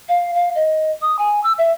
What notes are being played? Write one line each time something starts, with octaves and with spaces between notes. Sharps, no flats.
F5
F5
D#5
D#6
G#5
E6
E5